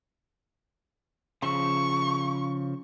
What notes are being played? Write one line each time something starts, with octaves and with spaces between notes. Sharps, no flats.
C#3 F3 C#6